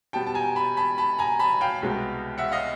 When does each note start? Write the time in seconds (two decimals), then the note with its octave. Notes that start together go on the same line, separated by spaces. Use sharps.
0.13 B2 G3 B3 G5 A5
0.26 A5
0.34 G#5 A#5
0.55 A5 B5
0.77 A5 B5
0.98 A5 B5
1.19 G#5 A#5
1.39 A5 B5
1.61 F5 G5
1.83 C2 B2 G#3 B3
2.38 E5 F#5
2.52 D#5 F5